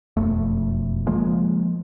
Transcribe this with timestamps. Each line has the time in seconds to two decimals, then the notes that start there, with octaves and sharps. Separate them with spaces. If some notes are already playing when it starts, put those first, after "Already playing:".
0.17 E1 F2 A3
1.07 C#3 F3 G#3 A#3